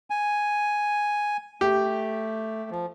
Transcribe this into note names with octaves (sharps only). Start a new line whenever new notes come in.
G#5
A3 G4
F3